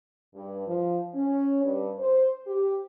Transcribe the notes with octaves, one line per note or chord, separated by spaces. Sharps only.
G2
F3
C#4
G2
C5
G4